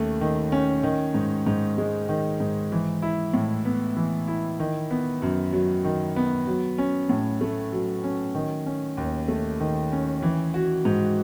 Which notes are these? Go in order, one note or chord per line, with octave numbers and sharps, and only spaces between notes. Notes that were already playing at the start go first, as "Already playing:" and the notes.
Already playing: D#2 A3 C#4
D#3
C#4
D#3
G#2
G#2
G#3
D#3
G#2
E3
E4
A2
B3
E3
E4
D#3
B3
F#2
F#3
D#3
B3
F#3
C#4
A2
A3
F#3
C#4
D#3
C#4
D#2
A3
D#3
C#4
E3
F#4
G#2